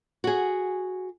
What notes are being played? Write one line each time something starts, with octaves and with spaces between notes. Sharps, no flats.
F#4 G#4